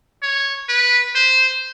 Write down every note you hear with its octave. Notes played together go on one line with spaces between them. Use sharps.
C#5
B4
C5